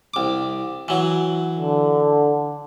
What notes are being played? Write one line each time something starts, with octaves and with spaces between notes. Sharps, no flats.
C2 D6
E3 F#3
D3